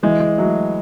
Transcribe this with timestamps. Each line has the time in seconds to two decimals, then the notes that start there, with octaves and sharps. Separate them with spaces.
0.03 E3 G#3
0.20 G#3
0.38 F#3 A3